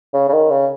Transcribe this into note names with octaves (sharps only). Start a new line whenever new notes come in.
C#3
C#3
D#3
C#3